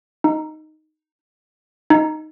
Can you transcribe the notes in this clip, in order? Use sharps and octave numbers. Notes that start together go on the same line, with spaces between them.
D#4
D#4